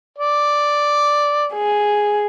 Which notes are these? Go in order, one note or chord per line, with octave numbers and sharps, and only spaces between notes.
D5
G#4